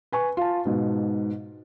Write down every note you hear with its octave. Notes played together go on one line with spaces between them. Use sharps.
B4 G#5 C#6
F4 A5
G#2 B2